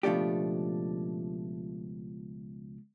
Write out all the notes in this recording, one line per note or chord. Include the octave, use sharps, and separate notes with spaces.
C#2 B2 F3 A3 D4 G4